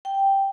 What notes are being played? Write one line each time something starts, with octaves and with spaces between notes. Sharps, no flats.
G5